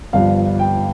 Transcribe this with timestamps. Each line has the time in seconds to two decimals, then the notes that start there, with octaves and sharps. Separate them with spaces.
0.13 G1 G2 F3 F5
0.59 G5